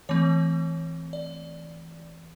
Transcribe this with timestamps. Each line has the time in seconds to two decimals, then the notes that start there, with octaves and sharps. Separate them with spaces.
0.09 E3 A3 C4 C#5
1.13 D5